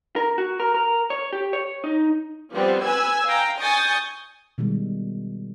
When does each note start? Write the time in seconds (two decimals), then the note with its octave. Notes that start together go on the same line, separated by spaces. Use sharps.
0.16 A#4
0.38 F#4
0.60 A#4
0.74 A#4
1.10 C#5
1.33 G4
1.53 C#5
1.84 D#4
2.53 F3 G3 B3 C4
2.84 B4 G#5 E6 G#6
3.26 F5 G5 A#5
3.60 G#5 C#6 D#6 G6 A6
4.58 B2 D#3 G3 G#3